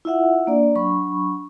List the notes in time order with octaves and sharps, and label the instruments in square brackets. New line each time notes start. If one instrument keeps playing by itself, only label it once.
[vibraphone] E4 F4 E5 F#5
A#3 D4 D5
F#3 D4 B5 C#6